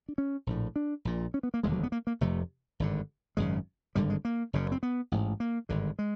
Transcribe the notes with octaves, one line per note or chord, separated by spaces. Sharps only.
D4
C#4
A#1 A2
D4
A#1 A#2
C#4
B3
A#3
E1 D#2 D3 G#3
F#3
B3
A#3
A#3
F1 F2 C3 A3
G#1 G2 D3
G#1 F#2 C#3 G#3
G#1 G2 D3 G3
G#3
A#3
F#1 F#2 C#3
C4
B3
A1 G#2
A#3
G#1 G2 D3
G#3